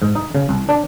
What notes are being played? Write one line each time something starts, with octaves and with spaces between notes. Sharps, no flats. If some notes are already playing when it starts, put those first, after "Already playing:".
G#2
D#4
C#3
C2
D4